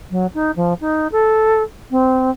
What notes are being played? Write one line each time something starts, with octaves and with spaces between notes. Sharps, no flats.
F#3
D#4
F3
D#4
A4
C4